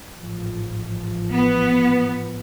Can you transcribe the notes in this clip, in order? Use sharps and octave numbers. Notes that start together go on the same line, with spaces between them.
A1 G#2 F3
B3